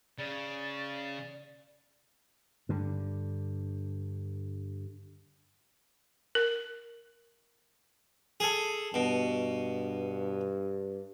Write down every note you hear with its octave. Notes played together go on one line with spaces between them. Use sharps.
C#3 D5 A6
G2 D3
A#4
G#4 A4
G2 B2